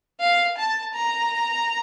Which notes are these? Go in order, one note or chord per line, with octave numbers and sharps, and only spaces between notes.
F5
A5
A#5